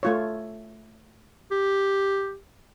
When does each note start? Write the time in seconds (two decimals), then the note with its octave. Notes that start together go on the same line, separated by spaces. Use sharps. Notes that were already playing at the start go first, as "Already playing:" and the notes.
0.03 A3 F4 C#5
1.51 G4